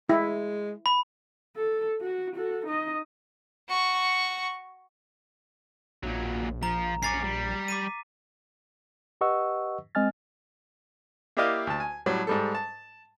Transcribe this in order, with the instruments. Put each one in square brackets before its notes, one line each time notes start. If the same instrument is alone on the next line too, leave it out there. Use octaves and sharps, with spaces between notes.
[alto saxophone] G#3 [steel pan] E4
[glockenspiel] B5
[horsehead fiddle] A4
F#4
F#4 A4
D#4 D#5
[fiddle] F#4 C#6
[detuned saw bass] A#1 [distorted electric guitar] A#2 F#3
[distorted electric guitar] F3 [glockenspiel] A#5
[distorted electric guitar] C#4 A#4 [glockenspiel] D6 A6 C7
[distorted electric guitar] G3
[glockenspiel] D6 B6 D#7
[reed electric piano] G4 B4 D#5 F#5 C#6 E6
G#3 C4 D#5 G#5 F6 A6
[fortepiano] A#3 E4 G4 D5 D#5 F5
D2 A5
G#5
A2 F#3 G3
G#2 G3 A4
A5